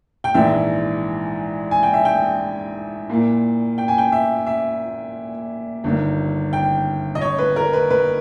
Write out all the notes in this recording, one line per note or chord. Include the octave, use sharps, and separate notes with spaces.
G5
A#1 G#2 E3 G#3 E5
G#5
G5
E5
G5
A#2 A#3 E4
G5
G#5
G5
E5
E5
G1 G2 D#3
G5
D#5
C#5
B4
A#4
B4
B4